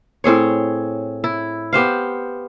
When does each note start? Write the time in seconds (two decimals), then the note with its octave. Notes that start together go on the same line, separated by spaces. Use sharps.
0.24 A2 C4 G#4 C#5
1.24 E4
1.73 B3 G4 C5 F5